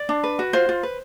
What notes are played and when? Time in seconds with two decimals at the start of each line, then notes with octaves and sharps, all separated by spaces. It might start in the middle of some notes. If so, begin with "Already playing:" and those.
Already playing: D5
0.09 D4
0.24 B4
0.39 F#4
0.53 F4 C5
0.69 F4
0.83 B4